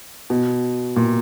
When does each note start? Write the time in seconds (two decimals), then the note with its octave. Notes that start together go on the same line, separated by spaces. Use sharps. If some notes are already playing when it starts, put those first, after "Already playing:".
0.30 B2
0.96 A#2